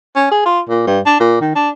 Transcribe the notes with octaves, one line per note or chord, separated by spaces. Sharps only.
C#4
G#4
F4
A#2
G2
D4
A#2
D#3
D4